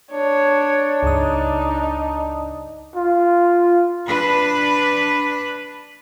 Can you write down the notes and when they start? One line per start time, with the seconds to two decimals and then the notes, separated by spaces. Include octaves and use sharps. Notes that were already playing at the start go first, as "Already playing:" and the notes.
0.12 D4 C#5
1.03 C#2 G2 D#4 D#6
2.96 F4
4.07 D4 B4